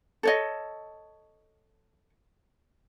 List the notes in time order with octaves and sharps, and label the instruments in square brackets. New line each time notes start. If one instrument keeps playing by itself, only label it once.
[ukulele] A4 C#5 D#5